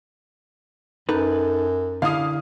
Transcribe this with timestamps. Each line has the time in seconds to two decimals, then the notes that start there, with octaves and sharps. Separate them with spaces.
1.09 F#2 D#4 A4 B4
2.02 D3 D4 E4 F5 D#6